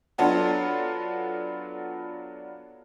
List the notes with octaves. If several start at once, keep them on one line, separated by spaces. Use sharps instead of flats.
F#3 B3 D4 F4 A4